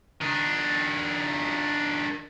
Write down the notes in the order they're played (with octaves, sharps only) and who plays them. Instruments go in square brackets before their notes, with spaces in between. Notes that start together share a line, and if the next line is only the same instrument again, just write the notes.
[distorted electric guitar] D#3 D4